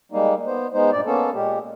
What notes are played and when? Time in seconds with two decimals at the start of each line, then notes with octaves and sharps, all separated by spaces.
0.12 G3 G#3 A#3 D#4
0.47 B3 C5
0.74 G#3 B3 D#4 C5
0.92 G2 A#2 D5
1.06 A#3 B3 C#4 A4
1.34 A#2 G#3 G4